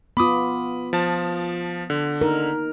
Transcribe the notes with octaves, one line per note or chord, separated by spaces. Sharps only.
B3 F4 B5 D6 D#6
F3 A5
D3
D#4 A#4